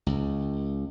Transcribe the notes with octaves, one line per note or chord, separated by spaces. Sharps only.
C#2